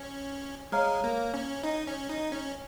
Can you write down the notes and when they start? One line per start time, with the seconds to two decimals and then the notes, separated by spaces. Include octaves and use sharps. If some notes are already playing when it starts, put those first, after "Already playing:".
Already playing: C#4
0.72 G#3 C#5 F5 A#5 F6
1.04 A#3
1.34 C#4
1.64 D#4
1.87 C#4
2.09 D#4
2.32 C#4